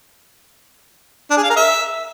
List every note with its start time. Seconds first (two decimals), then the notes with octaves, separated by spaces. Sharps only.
1.30 D4
1.37 G#4
1.43 F5
1.50 A#4
1.57 E5